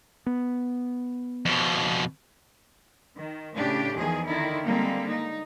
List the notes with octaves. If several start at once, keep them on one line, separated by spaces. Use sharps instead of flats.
B3
F2 B2
D#3
A2 C#3 D4 G4
E2 D#3 F3 G#4
D3 D#3 E4
D3 G3 G#3 A#3 C4
D#4